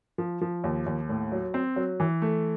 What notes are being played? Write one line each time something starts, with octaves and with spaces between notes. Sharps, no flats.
F3
F3
D#2
D#2
A2
F#3
C4
F#3
E3
A3